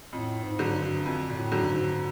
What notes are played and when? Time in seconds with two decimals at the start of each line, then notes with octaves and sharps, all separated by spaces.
0.12 F2 A2
0.43 G#2
0.59 D3 F#3
0.65 G#2
0.74 G2
1.06 F2
1.29 A#2
1.36 A2
1.52 D3 F#3
1.62 G2
1.67 G#2